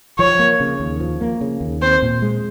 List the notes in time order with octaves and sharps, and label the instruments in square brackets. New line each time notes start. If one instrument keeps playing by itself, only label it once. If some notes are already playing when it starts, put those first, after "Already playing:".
[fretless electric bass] F3 [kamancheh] C#5
[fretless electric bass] A#3
C#3
D#2
F3
A#3
C#3
D#2
[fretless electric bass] C4 [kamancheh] C5
[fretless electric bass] A#2
G#3